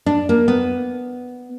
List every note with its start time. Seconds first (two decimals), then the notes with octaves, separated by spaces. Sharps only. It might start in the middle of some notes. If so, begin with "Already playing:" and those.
0.06 D4
0.29 A#3
0.48 B3